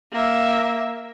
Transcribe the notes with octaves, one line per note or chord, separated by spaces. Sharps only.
A#3 E5